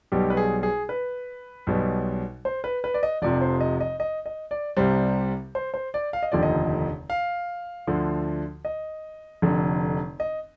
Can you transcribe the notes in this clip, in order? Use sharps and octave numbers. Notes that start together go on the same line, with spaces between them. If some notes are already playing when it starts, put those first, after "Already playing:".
B1 B2 G3 G4
B4
G#4
G#4
B4
B1 B2 G3
C5
B4
B4
D5
D#5
F1 F2 C3 F3 D5
C5
D#5
D#5
D#5
D#5
D5
C2 C3 G3 C5
C5
C5
D5
F5
D#5
F1 D#2 D3 F3 D5
D#5
F5
D2 D3 F3
D#5
F1 F2 D3
D#5